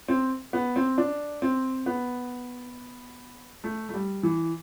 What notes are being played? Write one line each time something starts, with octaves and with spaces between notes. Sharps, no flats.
C4
B3
C4
D4
C4
B3
A3
A3
G3
E3